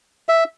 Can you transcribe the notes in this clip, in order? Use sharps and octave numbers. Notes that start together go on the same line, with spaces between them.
E5